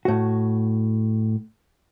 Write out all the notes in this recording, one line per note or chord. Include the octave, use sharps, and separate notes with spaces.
A2 F#4